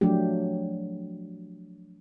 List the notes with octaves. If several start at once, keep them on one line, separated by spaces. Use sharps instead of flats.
F3 F#3 A3 D4 G4